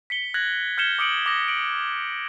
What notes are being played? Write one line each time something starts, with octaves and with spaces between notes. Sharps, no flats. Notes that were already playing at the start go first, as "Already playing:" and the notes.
B6 C#7 G7
F#6 G#6 A#6 F#7
F6 G6 G#6 C#7 E7 G7
D6 D#6 C#7 D7 F#7
D6 D#6 A#6
D7 F#7